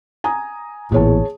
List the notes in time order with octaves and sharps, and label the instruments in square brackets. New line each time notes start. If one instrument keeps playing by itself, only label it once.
[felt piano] G#5 A#5 D#6
[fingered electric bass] A1 A#2 [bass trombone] E2 [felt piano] G#4 C#5 A5